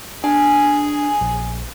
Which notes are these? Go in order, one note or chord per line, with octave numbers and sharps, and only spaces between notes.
D4 G#4 G#5
A#1